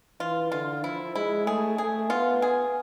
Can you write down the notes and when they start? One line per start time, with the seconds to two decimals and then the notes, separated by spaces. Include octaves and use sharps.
0.20 E3 F4
0.52 D3 F4
0.84 F3 E4
1.15 G#3 E4
1.46 A3 G#4
1.78 A3 G#4
2.10 B3 F4
2.42 G#4